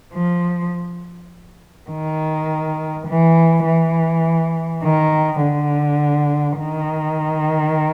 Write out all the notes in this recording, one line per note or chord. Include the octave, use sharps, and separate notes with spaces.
F3
D#3
E3
E3
D#3
D3
D#3